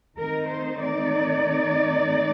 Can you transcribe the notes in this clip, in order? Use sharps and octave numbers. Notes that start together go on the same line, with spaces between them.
D#3 A3 C4 D#4 A#4
C5
D5